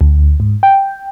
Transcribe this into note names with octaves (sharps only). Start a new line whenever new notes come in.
D2
G#2
G5